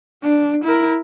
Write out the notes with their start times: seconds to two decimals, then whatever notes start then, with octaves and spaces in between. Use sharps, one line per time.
0.22 D4
0.65 E4 A#4